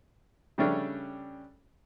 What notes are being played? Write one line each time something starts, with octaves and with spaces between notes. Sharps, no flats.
C#3 G3 A3 C#4 D4